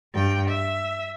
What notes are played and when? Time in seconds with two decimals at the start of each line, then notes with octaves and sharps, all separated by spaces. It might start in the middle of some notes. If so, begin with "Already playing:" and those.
0.14 G2 G5
0.48 E5